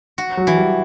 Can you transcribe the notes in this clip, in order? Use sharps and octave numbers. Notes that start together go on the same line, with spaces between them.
F#4
F#3
E3
G3